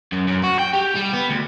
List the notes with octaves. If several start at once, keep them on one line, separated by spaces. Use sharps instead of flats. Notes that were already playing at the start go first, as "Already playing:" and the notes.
F#2
F#2
F#4
G5
G4
G3
B3
D2